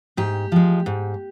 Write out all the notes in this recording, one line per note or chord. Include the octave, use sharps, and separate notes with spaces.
G#2 G4
F3 G#3
G#2